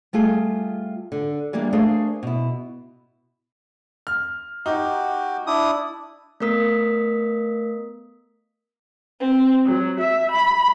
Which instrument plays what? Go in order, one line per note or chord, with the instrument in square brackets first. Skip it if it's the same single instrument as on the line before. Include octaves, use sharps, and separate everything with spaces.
[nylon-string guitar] G3 A3 F4 G#4
D3
E3 G3 G#3 A#3 D4
A3 D4 G#4 A#4 C5 F5
B2 E4
[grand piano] F6
[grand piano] D#4 [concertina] F#4 G4
[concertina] D4 E4 D#6
[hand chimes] A3 B3 A#4 D#6 B6
[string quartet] C4
F#3
E5
B5